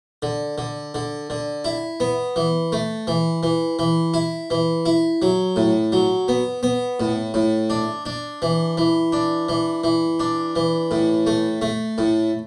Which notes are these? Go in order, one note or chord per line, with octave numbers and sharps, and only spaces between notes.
D3
D3
D3
D3
E4
B3
E3
A3
E3
E3
E3
E4
E3
E4
F#3
A2
F#3
B3
B3
A2
A2
D4
D4
E3
E3
D4
E3
E3
D4
E3
A2
A3
A3
A2